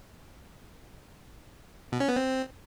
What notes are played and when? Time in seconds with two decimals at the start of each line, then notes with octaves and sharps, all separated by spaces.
1.92 B2
2.00 C#4
2.08 B3
2.16 C4